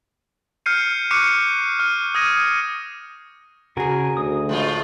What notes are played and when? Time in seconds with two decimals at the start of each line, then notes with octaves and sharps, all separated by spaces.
0.66 F6 G6 C7 C#7 D#7
1.11 C#6 D6 F#6 C7 C#7 D#7
1.80 F6 D#7
2.15 D#6 G#6 A#6 D#7
3.77 C#3 F#4 G#4 A#4 G#5
4.17 D2 D#6
4.49 A2 G#3 F4